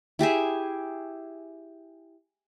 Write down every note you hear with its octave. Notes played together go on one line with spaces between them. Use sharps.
E4 G4 G#4 E5